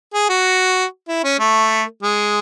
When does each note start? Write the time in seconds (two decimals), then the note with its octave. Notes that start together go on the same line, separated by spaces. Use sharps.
0.14 G#4
0.30 F#4
1.08 E4
1.24 C#4
1.39 A3
2.03 G#3